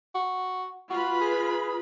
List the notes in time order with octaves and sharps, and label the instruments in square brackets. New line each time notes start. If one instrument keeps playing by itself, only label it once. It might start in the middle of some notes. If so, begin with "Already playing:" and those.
[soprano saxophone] F#4
[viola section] F4 B4 B5 [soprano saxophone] F#4
[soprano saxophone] G#4